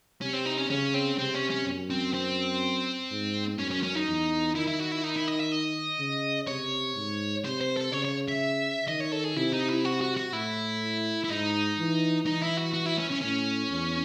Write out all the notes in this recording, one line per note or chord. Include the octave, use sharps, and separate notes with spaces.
C3 C#4
C4
D#4
C#4
C#3 C#4
C4
C3 C4
C#4
C#4
F#2
C4
C4
G#2
F#2 C#4
C#4
C#4
D#4
E2
D#3 E4
E4
F#4
E4
D#4
E4
D#5
E5
D#5
C#3
C3 C#5
G#2
C3 C5
C5
A4
C#3 C#5
C#5
E5
D#3 D#5
C#5
A4
G#4
C3 E4
D#4
E4
F#4
F#4
F#4
A2 E4
E4
G#2 D#4
E3
E3 D#4
E4
F#4
F#4
E4
C#4
C#4
A2 C#4
E2